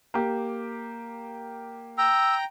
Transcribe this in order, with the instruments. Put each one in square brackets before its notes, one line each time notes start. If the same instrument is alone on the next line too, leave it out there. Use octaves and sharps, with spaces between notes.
[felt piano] A#3 G4
[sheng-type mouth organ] G5 A#5 [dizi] E6